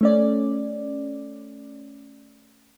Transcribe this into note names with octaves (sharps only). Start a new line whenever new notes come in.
A3 C#4 D5